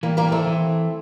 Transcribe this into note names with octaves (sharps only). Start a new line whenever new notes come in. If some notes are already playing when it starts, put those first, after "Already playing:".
E3 G3 A#3
G3 A#3
A3 C4
E3